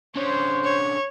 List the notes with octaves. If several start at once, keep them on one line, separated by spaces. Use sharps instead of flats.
D3 C#4 C5 C#5
C#5